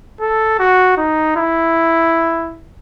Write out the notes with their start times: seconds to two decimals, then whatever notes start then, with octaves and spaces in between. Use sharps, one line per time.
0.20 A4
0.60 F#4
0.97 D#4
1.37 E4